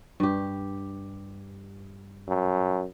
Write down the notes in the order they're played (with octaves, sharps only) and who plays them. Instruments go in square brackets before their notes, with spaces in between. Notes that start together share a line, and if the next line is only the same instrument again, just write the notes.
[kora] G2 G4
[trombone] F#2